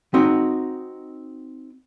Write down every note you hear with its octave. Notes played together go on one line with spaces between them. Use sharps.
C4 D#4 F#4 D#5